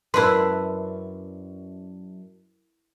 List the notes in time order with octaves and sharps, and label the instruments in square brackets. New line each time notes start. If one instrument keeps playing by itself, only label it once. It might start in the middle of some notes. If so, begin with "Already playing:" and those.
[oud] F#2 D4 [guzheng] E4 B4 [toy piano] A#4 C6